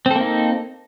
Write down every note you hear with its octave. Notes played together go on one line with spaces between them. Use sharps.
A#3 C4 D#4 A4